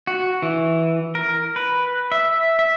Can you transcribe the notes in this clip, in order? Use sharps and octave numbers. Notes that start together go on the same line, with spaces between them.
F#4
E3
A#4
B4
E5
E5